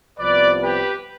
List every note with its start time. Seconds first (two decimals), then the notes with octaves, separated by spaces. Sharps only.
0.19 C2 C3 F3 B3 B4 D5
0.62 G4 B4